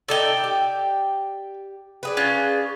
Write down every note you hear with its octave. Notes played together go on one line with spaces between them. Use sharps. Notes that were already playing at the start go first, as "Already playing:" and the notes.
D#4 A4 D5 E5 G5
G4
D4 G#4 B4
C#4 F4 F#6